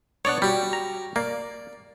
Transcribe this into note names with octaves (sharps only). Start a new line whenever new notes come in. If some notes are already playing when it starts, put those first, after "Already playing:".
B3 D4 C#5 D5 F#5
G3 F#4 G4
A#5
A#3 D5